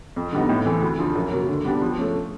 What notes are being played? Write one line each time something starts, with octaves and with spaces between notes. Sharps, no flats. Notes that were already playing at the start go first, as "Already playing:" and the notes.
F2
D3 G3 B3 D#4
A2
E3 A3 C4
D2
D3 F3
F#2
C#3 F#3 A#3 C#4
D3
G3 B3 D4 G4
F3
A3 C#4